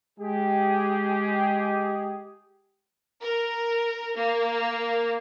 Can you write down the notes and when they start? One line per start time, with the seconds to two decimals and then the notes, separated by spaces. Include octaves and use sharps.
0.19 G#3 G4 G#4
3.21 A#4
4.16 A#3